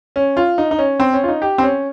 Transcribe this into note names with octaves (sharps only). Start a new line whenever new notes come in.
C#4
F4
D#4
D#4
C#4
C4
C#4
F4
D#4
G4
C4
C#4